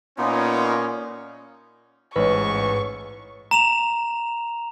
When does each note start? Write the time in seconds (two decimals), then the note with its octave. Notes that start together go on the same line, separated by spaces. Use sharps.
0.18 A#2 B3 C#4 D#4 F4
2.16 A1 G#2 B4 C#5 C#6
3.51 A#5 E7 F7